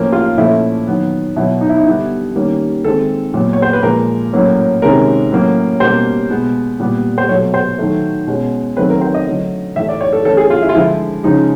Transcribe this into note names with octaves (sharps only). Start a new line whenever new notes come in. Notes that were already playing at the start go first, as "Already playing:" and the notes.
Already playing: A2 F3 A#3 C#4
F4
A#2 F3 A3 C#4 E4
D#3 F#3 B3
B2 F#3 B3 E4
D#4
E4
D#4
D3 G3 B3 E4
D#3 G3 A#3 C#4
D#3 G#3 C4 A4
A#2 F#3 B3
C#5
C5
B4
A#2 F3 G#3 A#4
A2 F#3 A#3 C#4
C3 D#3 G#3 C#4 A#4
A2 F#3 A#3 C#4
B2 G3 A#3 C#4 C5
B2 G#3 B3
A#2 G3 B3
C5
B2 F#3 A3 C#5
C5
D#3 F#3 A3
B2 G#3 C#4
D#3 F#3 A3 C4 B4
A#4
C5
D#5
D3 F#3 A3
A2 E3 A3 E5
D5
C#5
A4
E3 A3 C#4 A4
G#4
F4
E4
F4
D3 F3 G#3 E4
C#3 F3 G#3 D#4